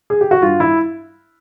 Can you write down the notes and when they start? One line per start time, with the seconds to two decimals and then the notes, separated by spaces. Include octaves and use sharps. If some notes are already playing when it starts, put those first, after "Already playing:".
0.10 G#4
0.21 G4
0.31 F#4
0.42 G2 F4
0.60 E4